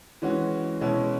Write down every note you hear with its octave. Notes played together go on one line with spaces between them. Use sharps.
E3 G#3 C#4 F#4
B2 G#3 C#4 E4